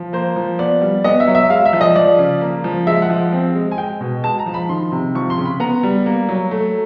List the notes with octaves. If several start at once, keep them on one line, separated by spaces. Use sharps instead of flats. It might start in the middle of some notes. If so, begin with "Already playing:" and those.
Already playing: F3
A#3 C5
F3
B3 D5
G3
B3 D#5
E5
F#3
E5
G#3 F5
E5
F3
D#5
F3 D5
C#3
A#3
F3
G#3 E5
F#5
F3
C4
G#3
G#5
G#3 G5
B2
G#3 A5
A#5
F3
B5
D#3 C6
C3
F3 C#6
C6
C#3
B5
B3 A#5
G3
A#3
F#3
A3